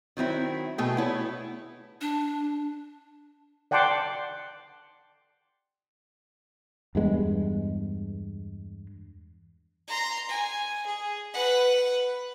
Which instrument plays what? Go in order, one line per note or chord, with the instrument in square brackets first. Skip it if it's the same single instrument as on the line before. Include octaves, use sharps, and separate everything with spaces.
[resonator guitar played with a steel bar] D#3 F#3 C4 E4
B2 A3 G#4 G5
B3 E4 C#5
[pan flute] D4
[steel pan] D5 F#5 G5 A5 C6 D6
[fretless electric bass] E2 G2 G#3 B3
[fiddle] A#5 C6
G#5
G#4
B4 F#5